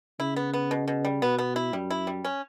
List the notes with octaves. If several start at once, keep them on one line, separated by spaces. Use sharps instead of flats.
C#3 E4
B3
B3
B2
B2
G3
B2 B3
B3
E4
F#2 G3
E4
G3
C#4